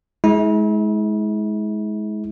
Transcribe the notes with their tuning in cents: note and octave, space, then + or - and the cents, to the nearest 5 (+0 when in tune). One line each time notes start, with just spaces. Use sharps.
G#3 +25 E4 -40